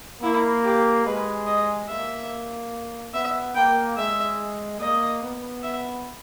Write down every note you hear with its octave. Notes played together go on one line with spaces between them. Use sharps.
A#3 E4
G4
G#3 B4
D#5
A#3 E5
B3 E5
A#3 G5
G#3 E5
A#3 D#5
B3
E5